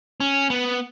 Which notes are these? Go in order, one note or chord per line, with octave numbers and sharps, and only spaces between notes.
C#4
B3